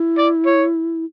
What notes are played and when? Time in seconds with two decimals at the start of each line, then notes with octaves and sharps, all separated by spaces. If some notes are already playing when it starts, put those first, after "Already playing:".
Already playing: E4
0.18 D5
0.46 C#5